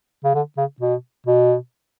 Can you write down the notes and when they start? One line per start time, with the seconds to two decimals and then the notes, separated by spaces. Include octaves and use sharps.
0.24 C#3
0.34 D3
0.57 C#3
0.80 B2
1.26 B2